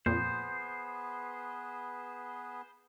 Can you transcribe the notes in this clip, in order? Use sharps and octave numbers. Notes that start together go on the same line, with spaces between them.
F2 A#2 B3 G#4 B4 C5